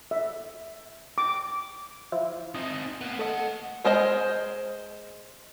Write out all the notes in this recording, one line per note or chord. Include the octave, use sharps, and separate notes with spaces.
E5
D6
F3 E4 F4
C4 D#4 D#6
A#3 B3
A3 A4 D#5 F#5
G#3 A#4 C5 D#5